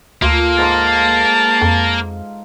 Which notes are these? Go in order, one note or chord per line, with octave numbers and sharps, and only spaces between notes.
D2 A#3 F4 A4
G#2 A5 A#5 C6
F2